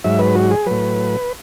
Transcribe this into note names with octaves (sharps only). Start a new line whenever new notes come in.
G#2 F#3 E5
B4
F#4
G#4
A2 F#3 B4